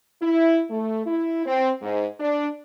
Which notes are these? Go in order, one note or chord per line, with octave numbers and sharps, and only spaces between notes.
E4
A3
E4
C4
G#2
D4